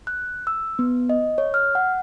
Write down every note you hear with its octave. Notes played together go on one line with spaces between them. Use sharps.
F#6
E6
B3
D#5
C#5
F6
F#5